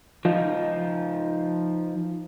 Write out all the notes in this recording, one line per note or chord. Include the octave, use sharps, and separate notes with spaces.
F3 D#4 F4